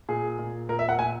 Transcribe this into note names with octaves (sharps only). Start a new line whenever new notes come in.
A#2 G#4
A#2
A#2 A#4
E5
F#5
A#2 G#5